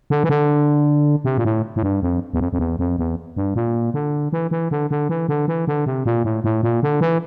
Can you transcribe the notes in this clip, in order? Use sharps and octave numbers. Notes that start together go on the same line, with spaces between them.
D3
E3
D3
C3
A#2
A2
A2
G2
F2
E2
F2
F2
E2
F2
E2
G2
A#2
D3
E3
E3
D3
D3
E3
D3
E3
D3
C3
A#2
A2
A2
A#2
D3
E3